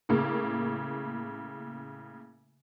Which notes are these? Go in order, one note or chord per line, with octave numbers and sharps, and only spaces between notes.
A2 C#3 A#3